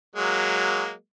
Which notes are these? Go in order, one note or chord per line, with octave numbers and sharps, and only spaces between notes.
F#3 G#3 A#3